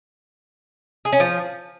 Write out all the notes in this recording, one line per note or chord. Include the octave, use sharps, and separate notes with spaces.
G#4
C#4
F3